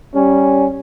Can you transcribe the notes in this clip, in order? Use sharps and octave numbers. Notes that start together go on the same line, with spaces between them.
G3 C#4